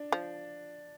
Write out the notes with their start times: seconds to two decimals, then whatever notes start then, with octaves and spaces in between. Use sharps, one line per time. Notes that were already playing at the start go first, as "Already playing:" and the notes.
Already playing: D4
0.12 F3